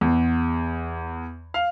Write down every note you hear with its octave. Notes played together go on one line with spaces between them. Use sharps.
E2
F5